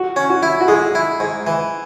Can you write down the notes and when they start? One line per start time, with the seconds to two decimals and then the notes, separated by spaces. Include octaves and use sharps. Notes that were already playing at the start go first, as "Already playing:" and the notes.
Already playing: F#4
0.16 C#4
0.30 F#4
0.43 E4
0.61 F#4
0.68 G#3 G#4
0.95 E4
1.20 G#2
1.47 E3